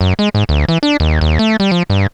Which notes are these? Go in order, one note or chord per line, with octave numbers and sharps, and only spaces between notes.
F#2
G#3
G#2
D2
E3
D4
D#2
D#2
A3
G3
F3
G2